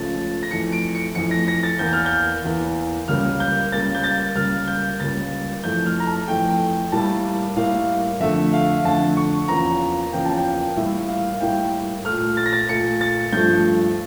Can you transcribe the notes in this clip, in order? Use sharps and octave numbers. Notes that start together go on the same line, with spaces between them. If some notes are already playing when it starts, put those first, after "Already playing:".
Already playing: C#2 C#3 F3 A3 A6
A#6
F2 E3 A3 C#7
D7
C#7
F2 E3 A3 C#7
A#6
A#6
A6
E2 E3 A#3 G6
F6
G6
E2 E3 A#3
C#2 C#3 G3 A#3 F6
G6
C#2 C#3 G3 A#3 A6
G6
A6
C#2 C#3 G3 A#3 F6
G6
C#2 C#3 G3 A#3 A6
F2 E3 A3 G6
F6
A#5
A5
F2 E3 A3 G5
A2 G3 A#3 A5
A2 G3 A#3 F5
F2 D3 A3 E5
F5
F2 D3 A3 A5
C#6
E2 C#3 F3 A#3 A#5
E2 C#3 F3 A#3 G5
A5
G5
A2 G3 A#3 E5
F5
A2 G3 A#3 G5
A#2 A3 F6
A6
A#6
A6
A#2 A3 C#7
A6
G2 F3 A3 G6